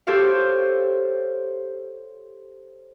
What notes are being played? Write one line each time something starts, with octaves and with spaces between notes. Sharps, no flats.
G4 A4 C5 C#5 F5